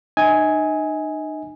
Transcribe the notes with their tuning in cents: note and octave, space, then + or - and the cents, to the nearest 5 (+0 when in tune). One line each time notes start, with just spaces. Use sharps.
D#4 -40 D#5 +40 G#5 +0